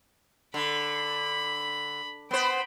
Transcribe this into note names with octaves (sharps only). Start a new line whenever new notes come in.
D3 B5
B3 C5 G5 B5